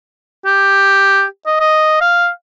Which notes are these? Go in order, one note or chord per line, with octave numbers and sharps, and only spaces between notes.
G4
D#5
D#5
F5